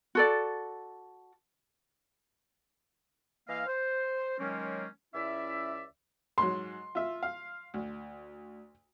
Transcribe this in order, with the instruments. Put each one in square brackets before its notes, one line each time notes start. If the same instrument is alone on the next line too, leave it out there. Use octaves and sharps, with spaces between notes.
[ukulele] F#4 A4 D5
[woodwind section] E3 A#3 D#5 F5
C5
D#3 F#3 G#3 A#3 C4 C#4
C#2 C#4 E4 D5 E5
[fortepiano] G#2 F#3 [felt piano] C6
[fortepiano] F4 E5
F5
D2